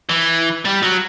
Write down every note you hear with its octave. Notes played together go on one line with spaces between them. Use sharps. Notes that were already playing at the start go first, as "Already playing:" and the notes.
E3
G3
F#3